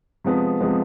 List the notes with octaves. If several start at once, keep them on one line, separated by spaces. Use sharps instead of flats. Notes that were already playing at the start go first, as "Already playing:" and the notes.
C3 F3 G#3 B3
C3 F3 G#3 B3